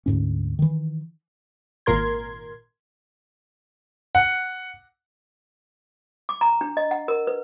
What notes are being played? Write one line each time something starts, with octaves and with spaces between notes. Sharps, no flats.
D2 G#2 C#4
D#3 E3
G#1 A#2 A#4 C6 G#6
F#5
D6
A#5
D4
D#5
F#5
A#4
B4